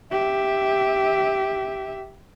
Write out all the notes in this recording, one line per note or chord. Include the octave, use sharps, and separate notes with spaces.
G4 E5